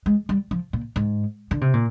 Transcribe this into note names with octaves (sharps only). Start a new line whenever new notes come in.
G#3
G3
F3
A#2
G#2
D3
C3
A#2